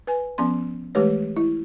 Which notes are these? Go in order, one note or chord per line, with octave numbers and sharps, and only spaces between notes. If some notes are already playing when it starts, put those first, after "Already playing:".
B4 G#5
F3 B3 C#4 C6
E3 G#3 A3 G4 B4 C#5
E4